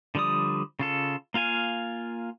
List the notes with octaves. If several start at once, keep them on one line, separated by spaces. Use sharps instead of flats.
D3 F3 G3 D5 D#6
C#3 F4 A4
A#3 F4 F5 G#5